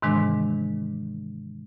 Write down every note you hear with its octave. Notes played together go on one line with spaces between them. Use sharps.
G#2 C3 D#3 E3 G#3 D4